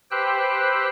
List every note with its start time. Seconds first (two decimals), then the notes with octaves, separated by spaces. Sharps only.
0.11 G4 B4 C5 G5 E6 F#6